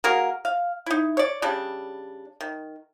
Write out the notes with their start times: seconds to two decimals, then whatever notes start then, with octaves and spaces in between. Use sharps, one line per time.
0.04 A#3 F#4 G#4 A#4
0.45 F5
0.86 D#4 E4
1.17 C#5 D5
1.42 C#3 G3 D4
2.41 D#3